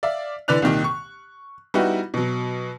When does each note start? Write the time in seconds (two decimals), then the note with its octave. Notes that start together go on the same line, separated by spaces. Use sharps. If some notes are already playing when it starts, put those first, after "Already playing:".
0.03 D5 E5 F5
0.48 D3 E3 B4 D5 F#6 F7
0.62 C2 A#2 D#3
0.84 C#6
1.74 G3 B3 D#4 E4 F#4
2.14 B2 F#3